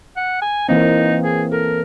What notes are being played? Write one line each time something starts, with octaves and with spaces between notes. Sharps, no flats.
F#5
G#5
E3 A#3 C4 D#4
G#4
A4 A#4